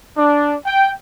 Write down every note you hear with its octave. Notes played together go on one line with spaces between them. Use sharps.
D4
G5